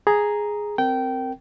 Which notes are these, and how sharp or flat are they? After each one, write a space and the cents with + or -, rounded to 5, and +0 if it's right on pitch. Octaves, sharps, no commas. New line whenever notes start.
G#4 +0 A#5 +0
C4 +0 A#4 -15 G5 -20